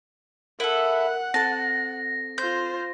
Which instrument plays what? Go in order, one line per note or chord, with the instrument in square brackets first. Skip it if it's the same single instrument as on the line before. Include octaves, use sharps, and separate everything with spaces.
[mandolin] E4 A4 [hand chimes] A#4 [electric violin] F#5
[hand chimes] C4 A4 [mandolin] A5 [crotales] A#6
[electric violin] F4 C5 [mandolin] G6